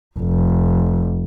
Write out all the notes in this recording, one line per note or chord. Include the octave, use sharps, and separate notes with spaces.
F1